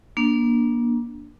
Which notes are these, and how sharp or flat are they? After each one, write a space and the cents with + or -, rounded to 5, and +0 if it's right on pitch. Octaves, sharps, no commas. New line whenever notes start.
A#3 +30 D4 +0